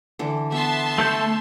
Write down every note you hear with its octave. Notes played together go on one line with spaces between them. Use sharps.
D3 E3
B3 E5 A5 C6
A3 A4 G6